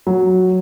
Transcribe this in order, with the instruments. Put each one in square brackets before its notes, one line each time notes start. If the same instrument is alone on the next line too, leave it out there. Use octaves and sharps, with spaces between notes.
[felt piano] F#3